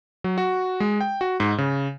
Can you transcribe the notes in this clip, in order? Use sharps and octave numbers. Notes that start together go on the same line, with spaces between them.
F#3
F#4
G#3
G5
F#4
G#2
C#3